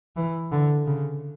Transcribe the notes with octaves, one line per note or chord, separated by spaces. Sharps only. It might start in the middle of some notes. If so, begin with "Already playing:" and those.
E3
D3
C#3